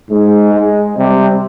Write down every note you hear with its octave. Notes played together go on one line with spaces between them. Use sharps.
G#2 G#3
G#3
C3 G3